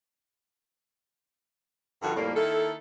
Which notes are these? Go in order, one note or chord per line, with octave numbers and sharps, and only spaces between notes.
G2 D3 D#3 F3 F4 F#4
F2 A2 D#3 G3 A#3
D#3 A#3 E4 A4